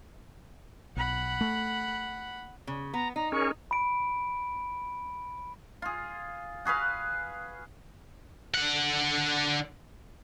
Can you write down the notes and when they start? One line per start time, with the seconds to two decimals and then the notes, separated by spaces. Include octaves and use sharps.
0.96 B1 F#5 B5
1.41 A3
2.67 C#3
2.94 B3 A#5
3.16 D#4 A#5
3.32 C#4 G#4 A#4 C#6
3.71 B5 D7
5.82 F4 G#4
6.65 F#4 G#4 B4 F5
8.54 D3 F#5